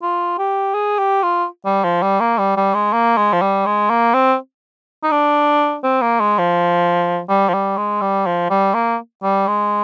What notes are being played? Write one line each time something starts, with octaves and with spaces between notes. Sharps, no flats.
F4
G4
G#4
G4
F4
G3
F3
G3
A#3
G3
G3
G#3
A#3
G#3
F3
G3
G#3
A#3
C4
D#4
D4
C4
A#3
G#3
F3
G3
F3
G3
G#3
G3
F3
G3
A#3
G3
G#3